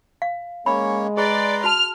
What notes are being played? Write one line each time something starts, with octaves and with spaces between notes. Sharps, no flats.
F5
G#3 A#3 C#4 C#5 B5
G#4 B4 D5 A#5 C6
F#4 A5 F6